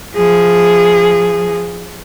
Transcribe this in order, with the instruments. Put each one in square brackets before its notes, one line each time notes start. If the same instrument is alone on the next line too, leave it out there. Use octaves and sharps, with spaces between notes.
[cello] F3 G#4